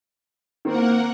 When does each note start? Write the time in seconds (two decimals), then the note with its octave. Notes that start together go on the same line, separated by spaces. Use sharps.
0.65 D#3 A#3 C4 A#4 F#5